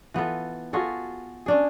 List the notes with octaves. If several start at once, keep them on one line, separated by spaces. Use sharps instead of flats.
E3 B3 F4 A4
F4 F#4 G#4 A4
C#4 D4 G#4